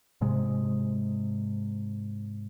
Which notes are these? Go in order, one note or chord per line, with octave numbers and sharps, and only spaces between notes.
G#2 C3 G#3